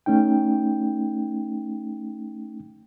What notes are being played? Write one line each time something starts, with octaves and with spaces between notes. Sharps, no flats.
A3 C#4 D#4 G5